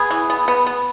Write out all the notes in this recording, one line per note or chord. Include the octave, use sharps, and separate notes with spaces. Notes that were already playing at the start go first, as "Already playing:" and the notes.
Already playing: B3 G#4
E3
B3
B3
B3